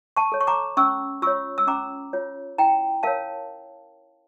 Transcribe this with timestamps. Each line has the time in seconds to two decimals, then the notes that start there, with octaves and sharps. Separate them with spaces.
0.17 A5 C#6
0.32 A4 C#5
0.41 C#6
0.47 A#5 D6
0.77 C#4 C#6 E6
1.22 F4 C#5 C#6 E6
1.58 E6
1.67 C#4 A#5 D6
2.13 F4 C#5
2.58 E4 G5 A#5
3.03 A#4 C#5 F5 A5